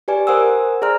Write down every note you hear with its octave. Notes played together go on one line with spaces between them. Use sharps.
G4 B4 D5 G#5
A#4 C5 F#5 G#5 D#6 E6
G#4 C5 D5 A#5 F6